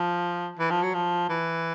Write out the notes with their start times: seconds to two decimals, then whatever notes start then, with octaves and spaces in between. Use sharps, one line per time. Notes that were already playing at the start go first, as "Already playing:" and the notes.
Already playing: F3
0.59 E3
0.70 F3
0.83 F#3
0.94 F3
1.29 E3